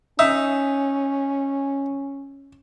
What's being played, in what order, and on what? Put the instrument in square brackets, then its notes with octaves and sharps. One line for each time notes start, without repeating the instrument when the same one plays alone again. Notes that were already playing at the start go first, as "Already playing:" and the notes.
[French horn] C#4 [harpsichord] D#4 [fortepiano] E5